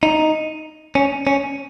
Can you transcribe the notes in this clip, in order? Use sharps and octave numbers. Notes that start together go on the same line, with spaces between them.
D#4
C#4
C#4